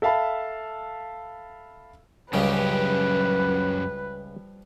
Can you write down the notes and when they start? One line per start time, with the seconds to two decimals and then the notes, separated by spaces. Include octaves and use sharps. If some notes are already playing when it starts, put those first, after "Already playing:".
0.02 A4 E5 F5 A5 B5
2.33 C#2 F#2 C#3 F3 G3 G4 B4